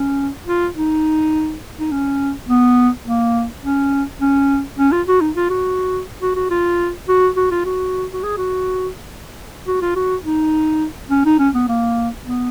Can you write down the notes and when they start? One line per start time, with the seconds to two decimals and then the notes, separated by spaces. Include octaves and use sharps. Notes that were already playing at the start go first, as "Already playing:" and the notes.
Already playing: C#4
0.47 F4
0.75 D#4
1.79 D#4
1.91 C#4
2.49 B3
3.05 A#3
3.63 C#4
4.21 C#4
4.79 C#4
4.92 F4
5.07 F#4
5.21 D#4
5.36 F4
5.50 F#4
6.22 F#4
6.36 F#4
6.50 F4
7.08 F#4
7.36 F#4
7.51 F4
7.65 F#4
8.13 F#4
8.23 G#4
8.37 F#4
9.67 F#4
9.81 F4
9.96 F#4
10.24 D#4
11.10 C#4
11.25 D#4
11.39 C#4
11.54 B3
11.68 A#3
12.26 B3